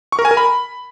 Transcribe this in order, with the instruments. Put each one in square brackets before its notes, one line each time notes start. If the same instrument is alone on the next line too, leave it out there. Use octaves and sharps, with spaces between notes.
[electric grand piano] C#6
A#4
G#5
A#4
B5